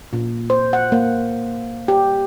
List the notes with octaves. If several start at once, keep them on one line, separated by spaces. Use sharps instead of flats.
A#2
C5
F#5
A#3
G4